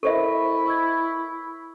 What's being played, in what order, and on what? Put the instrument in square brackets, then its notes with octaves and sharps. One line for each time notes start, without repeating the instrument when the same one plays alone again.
[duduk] E4 [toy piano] A4 C5 E5 [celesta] A#4 D#5 C#6
[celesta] C#6 E6 G#6